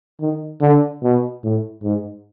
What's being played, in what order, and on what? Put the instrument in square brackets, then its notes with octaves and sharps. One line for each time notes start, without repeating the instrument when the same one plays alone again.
[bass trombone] D#3
D3
B2
A2
G#2